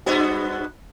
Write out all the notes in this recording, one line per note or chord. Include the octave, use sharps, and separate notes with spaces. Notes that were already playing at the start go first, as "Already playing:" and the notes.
G2 B3 F#4